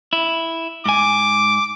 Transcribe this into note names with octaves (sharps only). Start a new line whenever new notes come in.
E4
G#2 G#5 D6